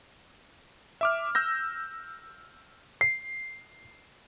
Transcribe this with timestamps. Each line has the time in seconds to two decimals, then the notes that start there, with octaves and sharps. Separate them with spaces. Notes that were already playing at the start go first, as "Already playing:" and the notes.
1.01 E5 D6 F6
1.35 E6 G6 A#6
3.01 C7